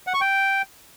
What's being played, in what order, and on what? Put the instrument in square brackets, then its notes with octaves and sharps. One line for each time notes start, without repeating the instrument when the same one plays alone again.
[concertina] F#5
C#6
G5